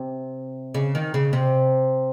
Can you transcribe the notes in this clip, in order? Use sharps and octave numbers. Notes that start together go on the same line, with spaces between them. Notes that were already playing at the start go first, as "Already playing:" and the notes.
Already playing: C3
C#3
D#3
C#3
C3